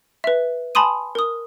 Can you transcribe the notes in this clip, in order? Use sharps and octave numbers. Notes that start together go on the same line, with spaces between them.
B4 E5
G#5 A5 B5 C6 D#6 D#7
A#4 D#6